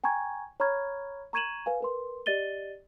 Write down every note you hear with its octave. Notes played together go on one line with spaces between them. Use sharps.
G5 G#5 A#5 C#6 G#6
C#5 A#5 B5 C#6 F6 G#6
A#5 C#6 G#6 D#7 E7 F#7
B4 F5 G#5
A#4 B4 C6
G4 D5 D#5 A6 D#7 G7